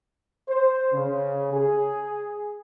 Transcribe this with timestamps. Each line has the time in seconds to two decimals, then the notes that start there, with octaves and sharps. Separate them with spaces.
0.48 C5
0.93 C#3
1.53 G#4